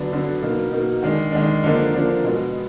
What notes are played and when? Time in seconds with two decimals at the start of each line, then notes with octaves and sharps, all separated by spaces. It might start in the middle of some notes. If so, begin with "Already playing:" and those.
Already playing: D3 F#3 B3 D4
0.12 D3 F#3 B3 D4
0.42 B2 A#3 D#4
0.72 B2 A#3 D#4
1.03 D#3 G#3 D4
1.32 D#3 G#3 D4
1.64 D3 F3 A#3 D4
1.93 D3 F3 A#3 D4
2.24 B2 G#3 B3